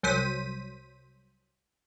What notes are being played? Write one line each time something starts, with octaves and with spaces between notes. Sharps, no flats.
C2 F#3 C5 B6 D#7